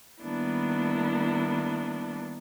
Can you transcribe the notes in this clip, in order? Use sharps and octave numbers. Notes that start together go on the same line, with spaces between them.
D#3 G3 A#3 B3 D4 E4